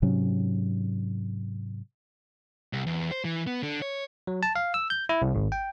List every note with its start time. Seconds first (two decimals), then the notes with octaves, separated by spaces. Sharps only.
0.02 G#2 C3 F#3 C#4
2.73 C2
2.86 E2
3.11 C5
3.25 E3
3.47 B3
3.63 D3
3.82 C#5
4.27 F#3
4.43 A5
4.56 F5
4.74 E6
4.90 G6
5.09 E4
5.22 C2
5.35 G#1
5.52 G5